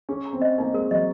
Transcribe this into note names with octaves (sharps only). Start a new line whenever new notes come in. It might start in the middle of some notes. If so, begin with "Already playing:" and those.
C#4 G#4
A#5
C4
D#5
A#3 D#4
G#3 A#4
F#3 D#5